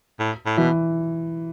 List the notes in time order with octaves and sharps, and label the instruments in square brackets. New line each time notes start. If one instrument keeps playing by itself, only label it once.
[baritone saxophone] A2
A2
[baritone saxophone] B2 [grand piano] E3